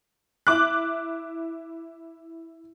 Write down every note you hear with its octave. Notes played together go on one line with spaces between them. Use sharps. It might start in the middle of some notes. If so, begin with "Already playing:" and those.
E4 D6 F#6